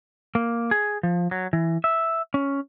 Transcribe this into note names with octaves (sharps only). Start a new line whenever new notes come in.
A#3
G#4
F3
F#3
E3
E5
C#4